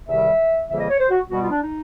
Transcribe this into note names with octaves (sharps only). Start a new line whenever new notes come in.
E2 C3 D#3 G3 E5
F2 C#3 E3 G3 A#3 E5
D#5
C#5
C5
F#4
B2 G3 B3 F#4
F4
D4
D#4